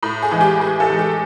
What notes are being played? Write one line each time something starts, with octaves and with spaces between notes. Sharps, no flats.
A2
G#4
E3 G#3
G4
A2 G#4
A4
E3 G#3
G4